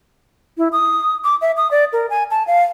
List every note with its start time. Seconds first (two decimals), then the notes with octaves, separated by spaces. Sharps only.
0.58 E4
0.72 D#6
1.24 D6
1.42 E5
1.57 D#6
1.71 D5
1.93 A#4
2.10 G#5
2.31 A5
2.47 F5